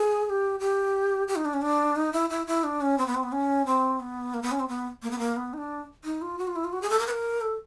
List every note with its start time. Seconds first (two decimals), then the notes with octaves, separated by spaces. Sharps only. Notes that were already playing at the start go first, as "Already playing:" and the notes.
Already playing: G#4
0.25 G#4
0.30 G4
0.60 G4
1.28 G4
1.36 D#4
1.45 D4
1.54 C#4
1.62 D4
1.96 D#4
2.13 E4
2.30 E4
2.47 E4
2.64 D4
2.81 C#4
2.98 C4
3.06 B3
3.15 C4
3.23 B3
3.32 C#4
3.66 C4
4.00 B3
4.34 A#3
4.43 B3
4.52 C#4
4.60 C4
4.68 B3
5.03 A#3
5.11 B3
5.19 A#3
5.36 B3
5.53 D#4
5.58 D4
6.04 D#4
6.22 F4
6.39 F#4
6.47 F4
6.56 E4
6.64 F4
6.73 F#4
6.82 G#4
6.90 A4
6.99 A#4
7.07 B4
7.11 A#4
7.41 A4